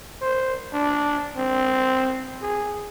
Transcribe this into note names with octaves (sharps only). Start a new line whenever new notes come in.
C5
D4
C4
G#4